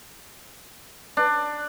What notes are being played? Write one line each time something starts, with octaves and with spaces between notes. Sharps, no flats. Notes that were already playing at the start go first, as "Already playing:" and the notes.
D4